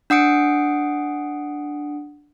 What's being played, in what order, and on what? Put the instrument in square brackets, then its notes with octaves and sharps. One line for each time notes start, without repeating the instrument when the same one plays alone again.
[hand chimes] D4 F#5 D#6 C#7 D7